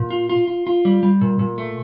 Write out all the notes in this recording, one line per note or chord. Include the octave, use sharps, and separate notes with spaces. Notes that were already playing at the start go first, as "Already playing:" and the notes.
Already playing: A#2
F4
F4
F4
F4
G3
G3
A#2
A#2
A3